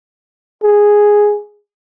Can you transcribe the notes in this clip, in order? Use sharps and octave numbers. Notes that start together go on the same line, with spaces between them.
G#4